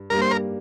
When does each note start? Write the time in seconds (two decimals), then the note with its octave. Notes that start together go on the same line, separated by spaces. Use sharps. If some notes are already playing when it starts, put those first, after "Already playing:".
Already playing: G2
0.10 G2 G3 A#3 A#4
0.22 C5
0.31 A#4